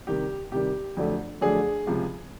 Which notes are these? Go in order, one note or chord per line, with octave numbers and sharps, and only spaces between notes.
C3 D#3 G3 G4
C3 D#3 G3 G4
F2 D3 F#3 A3 D4
F2 D3 F#3 A3 D4 G#4
C#2 C3 F3